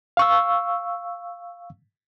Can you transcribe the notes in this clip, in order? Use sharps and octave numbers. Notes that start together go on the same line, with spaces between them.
F5 C#6 E6